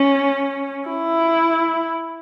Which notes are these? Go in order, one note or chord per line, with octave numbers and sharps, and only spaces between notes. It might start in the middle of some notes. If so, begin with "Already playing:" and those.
Already playing: C#4
E4